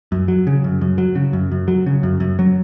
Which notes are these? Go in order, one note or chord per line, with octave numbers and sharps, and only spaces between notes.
F#2
F#3
C#3
F#2
F#2
F#3
C#3
F#2
F#2
F#3
C#3
F#2
F#2
F#3